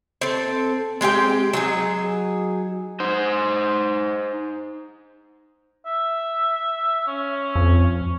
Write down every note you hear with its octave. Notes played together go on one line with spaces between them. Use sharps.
C4 A4
G#3 C4 G4 G5
F#3 D#4 G#4
D#4 C5
E5
C#4
F2